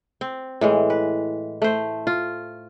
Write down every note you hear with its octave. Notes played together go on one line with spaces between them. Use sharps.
C4
A2 E3 G#3
B4
A3 C5
F4